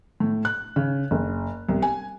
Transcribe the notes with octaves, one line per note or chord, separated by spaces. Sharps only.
A2
F#6
C#3
F#1
C2
G#5